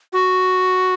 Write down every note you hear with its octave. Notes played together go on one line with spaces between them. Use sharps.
F#4